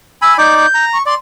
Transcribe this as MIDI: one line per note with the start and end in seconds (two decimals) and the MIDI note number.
0.22 0.37 80
0.22 0.37 83
0.22 0.34 88
0.38 0.66 63
0.38 0.66 74
0.38 0.66 86
0.38 0.54 91
0.57 0.85 91
0.74 0.98 82
0.93 1.05 85
1.06 1.15 74
1.06 1.14 84